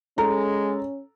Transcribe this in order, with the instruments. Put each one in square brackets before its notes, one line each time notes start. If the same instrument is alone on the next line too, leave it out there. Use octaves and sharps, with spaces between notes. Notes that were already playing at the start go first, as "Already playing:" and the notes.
[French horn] G#3 [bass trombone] C#4 [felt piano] A4 A#5